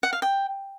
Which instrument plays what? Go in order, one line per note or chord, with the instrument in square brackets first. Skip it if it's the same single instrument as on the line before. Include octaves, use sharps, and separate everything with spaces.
[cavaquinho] F#5
F5
G5